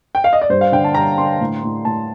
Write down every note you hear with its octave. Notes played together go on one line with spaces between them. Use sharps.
G5
F5
D#5
D5
G2 C5
F5
D3 G5
A5
G2 A#5
D3 C6
A2
A2
A2 A5